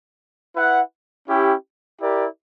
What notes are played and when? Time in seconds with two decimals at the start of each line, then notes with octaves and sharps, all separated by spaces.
0.55 E4 B4 F#5
1.28 C#4 E4 G4
2.01 E4 G4 A#4 D5